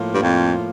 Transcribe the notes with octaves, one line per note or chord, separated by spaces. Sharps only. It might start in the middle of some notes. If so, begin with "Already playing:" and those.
Already playing: A2 F3 A#3 F4
G2
F2